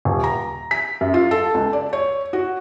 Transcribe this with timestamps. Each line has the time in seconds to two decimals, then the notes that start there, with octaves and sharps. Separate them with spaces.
0.05 D#1
0.24 A#5
0.71 B6
1.01 F#2
1.14 F4
1.31 A4
1.54 C#2
1.73 D5
1.93 C#5
2.33 F#4